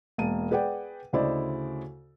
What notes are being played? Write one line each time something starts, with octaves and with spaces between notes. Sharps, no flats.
E1 A#3 A5 D#7
G#4 B4 D5 F#5 G5
D2 C#3 E4 C5 D5 D#5